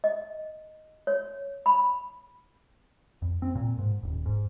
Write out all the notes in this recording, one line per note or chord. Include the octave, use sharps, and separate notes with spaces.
D#5
C#5
B5
F2
C4
A#2
G#2
D#1
G#2